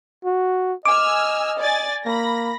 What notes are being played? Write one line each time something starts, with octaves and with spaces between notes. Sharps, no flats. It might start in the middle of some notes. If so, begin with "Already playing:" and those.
F#4
D#5 G#5 D6 E6 F6
D5 G#5 A6
A#3 B5 A#6